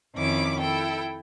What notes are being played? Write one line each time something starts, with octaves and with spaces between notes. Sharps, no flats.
F2 D#3 C#4 E4 D6
E4 A4 G5